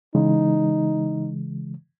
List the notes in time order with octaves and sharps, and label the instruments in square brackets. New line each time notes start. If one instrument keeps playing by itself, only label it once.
[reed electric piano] C#3 E3 G#3 [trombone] D#4